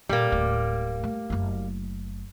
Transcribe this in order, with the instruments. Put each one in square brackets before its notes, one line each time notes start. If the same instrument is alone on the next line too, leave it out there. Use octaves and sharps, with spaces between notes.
[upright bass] A#2 [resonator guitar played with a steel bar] G3 A#3
[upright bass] D1 A2
A3
F#1 A3